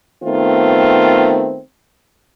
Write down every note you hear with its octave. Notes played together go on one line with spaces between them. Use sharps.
D#3 A3 B3 C4 F4